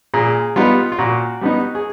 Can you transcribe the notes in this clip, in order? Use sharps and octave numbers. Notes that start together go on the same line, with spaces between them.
A#2 G#4
G3 B3 D#4 F4
F4
A#2 F#4
G3 B3 D#4
G#4